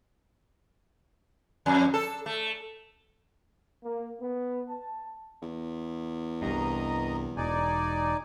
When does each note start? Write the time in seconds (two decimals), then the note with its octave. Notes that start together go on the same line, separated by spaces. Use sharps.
1.66 F2
1.94 A4
2.26 A3
3.83 A#3
4.20 B3
4.69 A5
5.42 E2
6.42 C2 G2 D#5 A#5
7.37 E1 D#4 D5 G#5